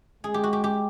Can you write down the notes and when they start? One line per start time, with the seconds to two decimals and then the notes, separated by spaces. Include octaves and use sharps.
0.24 G#3 G#4
0.34 G4
0.44 F#4
0.53 G4
0.64 G4